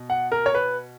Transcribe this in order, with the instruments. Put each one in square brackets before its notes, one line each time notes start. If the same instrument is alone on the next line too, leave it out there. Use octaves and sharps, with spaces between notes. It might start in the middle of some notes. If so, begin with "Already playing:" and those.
Already playing: [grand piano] B2
F#5
A#4
C#5
B4